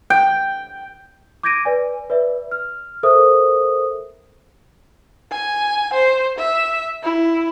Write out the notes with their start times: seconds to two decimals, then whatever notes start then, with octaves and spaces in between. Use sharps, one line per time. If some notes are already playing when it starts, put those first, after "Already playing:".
0.10 G5
1.43 D6 G6 G#6 A#6 D7 D#7
1.65 B4 D5 G#5
2.10 B4 D5 E5
2.51 F6
3.03 A4 A#4 C5 E5 D#6
5.32 G#5
5.93 C5
6.38 E5
7.03 E4